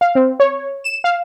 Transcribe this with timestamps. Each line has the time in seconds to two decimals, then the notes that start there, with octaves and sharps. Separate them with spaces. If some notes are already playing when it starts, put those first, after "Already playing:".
0.01 F5
0.15 C4
0.40 C#5
0.84 E7
1.04 F5